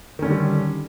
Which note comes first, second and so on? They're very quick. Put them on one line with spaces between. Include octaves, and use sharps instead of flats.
D#3 C#4 D3 G3